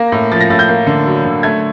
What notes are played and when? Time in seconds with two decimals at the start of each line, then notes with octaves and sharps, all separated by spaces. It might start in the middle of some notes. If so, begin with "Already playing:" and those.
Already playing: A#3 A#6
0.12 A2
0.32 F3 A6
0.41 A#6
0.50 A2 A6
0.59 G6
0.69 A#3
0.87 D3
1.06 F#3
1.25 D3
1.43 A3 G#6